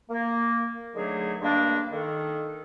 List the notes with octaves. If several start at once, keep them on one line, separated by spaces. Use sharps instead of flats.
A#3
D3 D#3 F#3 A3 G#4
G2 G#3 A#3 D4
D#3 A4